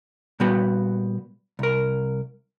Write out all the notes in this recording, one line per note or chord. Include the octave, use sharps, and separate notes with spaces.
A#2 G3 B3 F#4
C2 A#4